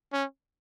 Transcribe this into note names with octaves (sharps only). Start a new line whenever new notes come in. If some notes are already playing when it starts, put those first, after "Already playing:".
C#4